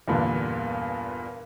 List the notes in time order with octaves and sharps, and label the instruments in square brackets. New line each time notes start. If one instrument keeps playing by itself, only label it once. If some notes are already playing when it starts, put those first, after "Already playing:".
[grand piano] E2 G2 A#2 D3